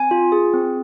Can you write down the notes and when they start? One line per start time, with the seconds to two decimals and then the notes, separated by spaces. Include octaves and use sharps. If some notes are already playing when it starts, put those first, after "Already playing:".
Already playing: C4 G#5
0.11 F4
0.32 G#4
0.53 C4